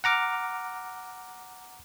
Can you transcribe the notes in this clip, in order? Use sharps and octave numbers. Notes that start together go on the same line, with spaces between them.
F#5 A#5 D6 F6